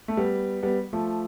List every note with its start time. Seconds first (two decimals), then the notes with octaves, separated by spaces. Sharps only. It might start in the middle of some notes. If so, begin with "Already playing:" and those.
0.08 A3
0.17 G3 B3
0.63 G3 B3
0.93 F3 A3